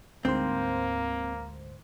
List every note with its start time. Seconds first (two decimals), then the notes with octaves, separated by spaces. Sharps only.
0.25 D2 G#2 A#3 C4 C5